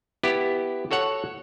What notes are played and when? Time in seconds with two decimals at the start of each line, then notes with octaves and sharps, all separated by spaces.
0.23 B3 E4 G4
0.91 F#4 A4 C#5 F#5